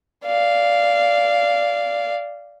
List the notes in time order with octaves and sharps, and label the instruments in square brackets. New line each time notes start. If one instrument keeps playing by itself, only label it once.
[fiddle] D5 F5